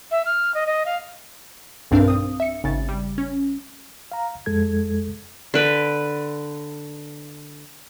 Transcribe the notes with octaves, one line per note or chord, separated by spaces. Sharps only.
E5
F6
D#5
D#5
F5
B1 G2 C4 D4 A#4 F5
C4 D#6
E5 C#7
G#1 C#3 A6
G3
C#4
F5 A#5
F2 G#3 A4 G#6
D3 B4